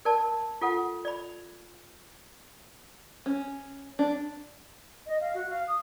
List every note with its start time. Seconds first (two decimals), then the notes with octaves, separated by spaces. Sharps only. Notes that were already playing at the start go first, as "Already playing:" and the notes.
0.05 A#4 D5 A5
0.61 F4 A4 F#5
1.05 D5 B5
3.26 C#4
3.99 D4
5.06 D#5
5.21 F5
5.34 F#4
5.49 F5
5.68 D#6